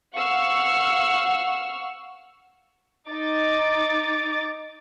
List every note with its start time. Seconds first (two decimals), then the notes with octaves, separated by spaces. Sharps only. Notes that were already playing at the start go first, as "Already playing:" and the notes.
0.15 F5 F#5 C#6 E6 F6
3.09 D#4 D6 A6